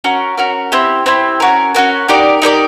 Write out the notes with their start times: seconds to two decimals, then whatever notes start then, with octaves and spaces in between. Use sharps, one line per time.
0.04 C#4 F#4 A#4
0.37 C#4 F#4 A#4
0.72 C4 E4 G4
1.06 C4 E4 G4
1.40 C#4 F#4 A#4
1.75 C#4 F#4 A#4
2.08 D#4 G4 A#4 D5
2.42 D#4 G4 A#4 D5